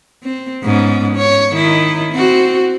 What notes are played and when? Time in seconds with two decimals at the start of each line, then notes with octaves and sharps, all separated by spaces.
0.23 C4
0.64 G#2 B3 C#4
1.17 C#5
1.52 D#3 D#4 E4
2.13 C4 F#4